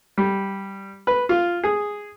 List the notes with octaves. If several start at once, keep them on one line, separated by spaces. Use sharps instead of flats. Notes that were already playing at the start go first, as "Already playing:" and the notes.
G3
B4
F4
G#4